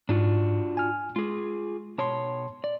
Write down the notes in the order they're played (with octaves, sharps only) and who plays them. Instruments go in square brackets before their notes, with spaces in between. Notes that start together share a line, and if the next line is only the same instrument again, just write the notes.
[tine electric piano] G#2 [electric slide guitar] D4 F4 F#4
[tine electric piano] G#5 F6
[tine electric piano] G#3 [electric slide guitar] F4 G#4
[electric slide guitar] B2 C#5 [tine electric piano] A5 C6
[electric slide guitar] D5